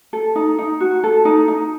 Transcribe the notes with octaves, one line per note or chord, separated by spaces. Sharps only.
A4
D#4
D#4
F#4
A4
D#4
D#4